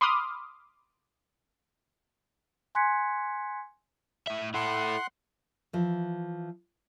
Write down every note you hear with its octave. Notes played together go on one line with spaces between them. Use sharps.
B5 C6 D6 D#6 F6
G#5 C6 F#6 G#6 B6 C#7
A2 E5
E4 A4 F#5 C6 F#6
E3 F3